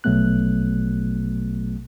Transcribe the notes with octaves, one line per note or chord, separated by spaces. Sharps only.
A#1 B2 F#3 A3 B3 F#6